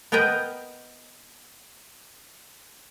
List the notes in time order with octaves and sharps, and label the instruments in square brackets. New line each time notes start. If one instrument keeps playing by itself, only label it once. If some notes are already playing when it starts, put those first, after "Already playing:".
[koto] B3 A#4 B4 D#5 G5